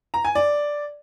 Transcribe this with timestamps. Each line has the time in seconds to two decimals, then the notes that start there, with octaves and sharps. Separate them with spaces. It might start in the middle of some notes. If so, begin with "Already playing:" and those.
0.14 A#5
0.25 G#5
0.35 D5